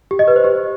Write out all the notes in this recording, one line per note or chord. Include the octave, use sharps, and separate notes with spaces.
G4
D#5
B4
C5
G4